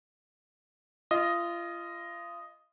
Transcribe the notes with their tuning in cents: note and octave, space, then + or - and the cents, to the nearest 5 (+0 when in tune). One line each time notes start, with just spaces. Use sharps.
F4 -30 D#5 +0